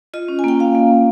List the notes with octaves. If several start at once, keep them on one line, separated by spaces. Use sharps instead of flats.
F4 D#5
C#4
G#5
A#3 G5
A#3 F5
A#3
A#3